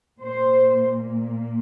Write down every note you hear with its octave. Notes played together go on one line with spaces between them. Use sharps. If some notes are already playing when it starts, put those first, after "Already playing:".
A#2 A#3 C5